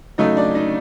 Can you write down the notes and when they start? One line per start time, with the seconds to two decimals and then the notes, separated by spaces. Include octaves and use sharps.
0.18 C#3 F#3 A3 D#4 D#5
0.37 D4 D5
0.55 D#4 D#5